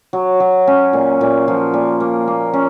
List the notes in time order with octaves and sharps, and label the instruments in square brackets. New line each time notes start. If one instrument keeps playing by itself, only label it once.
[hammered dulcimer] F#3
F#3
C#4
A#2
A#2
F3
A#2
A#3
A#3
C#4